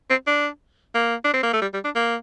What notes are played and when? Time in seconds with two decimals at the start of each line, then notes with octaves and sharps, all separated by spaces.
0.10 C4
0.27 D4
0.95 A#3
1.24 D4
1.33 C4
1.43 A#3
1.53 A3
1.61 G3
1.74 G3
1.84 D4
1.95 A#3